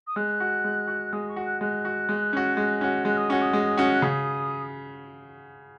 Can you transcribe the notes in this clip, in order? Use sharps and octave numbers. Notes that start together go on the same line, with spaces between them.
D#6
G#3 F#6
F#4
G#3
F#4
G#3 D#6
C#6
F#4
F#6
G#3 F#6
F#4
G#3
C#4 F#4
G#3
C#4 F#4
G#3 F#6
D#6
C#4 F#4 C#6
D#6
G#3
C#4 F#4
F#6
C#3 D#6